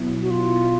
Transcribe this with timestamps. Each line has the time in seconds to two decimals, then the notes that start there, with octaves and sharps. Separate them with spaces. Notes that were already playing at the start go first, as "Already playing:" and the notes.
Already playing: B2 F#3 B3 E4
0.22 F#4
0.30 F4